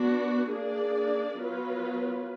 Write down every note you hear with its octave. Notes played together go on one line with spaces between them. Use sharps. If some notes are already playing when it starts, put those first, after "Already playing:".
Already playing: B3 D4 F#4
A#3 D4 G#4 D5
F#3 B3 F4 B4